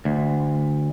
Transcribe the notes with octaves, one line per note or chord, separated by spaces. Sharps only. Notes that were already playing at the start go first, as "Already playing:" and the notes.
D2